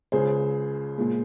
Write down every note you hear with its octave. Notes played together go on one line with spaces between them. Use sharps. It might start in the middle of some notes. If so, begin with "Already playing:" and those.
C#2 C#3 G#3 G#4 C5
A#2 G#3